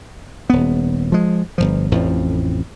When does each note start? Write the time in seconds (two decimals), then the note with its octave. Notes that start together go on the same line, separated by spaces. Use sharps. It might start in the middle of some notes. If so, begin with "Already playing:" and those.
0.50 D#1 B3
1.12 F3 G#3
1.58 G1 C2 F3
1.92 A1 F2 A2 F3